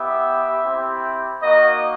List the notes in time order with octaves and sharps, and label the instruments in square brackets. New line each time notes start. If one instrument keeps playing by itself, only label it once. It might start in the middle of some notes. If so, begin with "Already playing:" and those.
Already playing: [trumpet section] B3 E4 G4 E5
C4 E4 G4
A#3 D#4 F#4 D#5